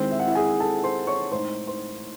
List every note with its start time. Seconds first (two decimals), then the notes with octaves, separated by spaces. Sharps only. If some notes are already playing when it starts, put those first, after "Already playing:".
Already playing: D#2 D#3 G#3 C4 E4 C5
0.11 E5
0.20 F#5
0.27 E4 E5
0.35 G#4 G#5
0.60 A4 A5
0.84 C5 C6
1.07 C#5 C#6
1.32 A2 G#3 D#4 C5 C6
1.67 C5 C6